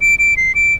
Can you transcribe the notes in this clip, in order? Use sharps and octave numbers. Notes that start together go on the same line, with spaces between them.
D7
D7
C7
D7